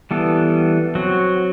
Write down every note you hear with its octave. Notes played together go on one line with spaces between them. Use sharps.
E3 G3 B3 A4
F#3 C4 F#4